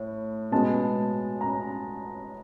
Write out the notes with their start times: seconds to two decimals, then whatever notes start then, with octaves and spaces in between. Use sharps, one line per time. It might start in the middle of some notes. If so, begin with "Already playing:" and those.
Already playing: A2
0.52 B2 G#3 B3 A5
1.41 A#5